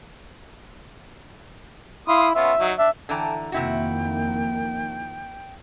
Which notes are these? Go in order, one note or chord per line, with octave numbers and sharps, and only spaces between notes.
E4 F5 C6 D#6
B3 C#4 F4 E5
F#3 D#4
D4 E5
D3 E3 A4 G5 A5 A#5
F2 C3 D#3 A#3 E4 F#4 G5